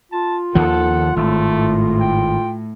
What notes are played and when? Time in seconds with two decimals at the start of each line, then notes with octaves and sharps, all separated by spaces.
0.12 F4 A5
0.55 D#2 D#3 F3 A4 F#5
1.16 G#1 A2 A3
2.00 G5